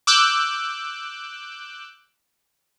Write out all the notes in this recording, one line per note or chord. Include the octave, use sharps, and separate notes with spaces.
D6 E6 F#6 G6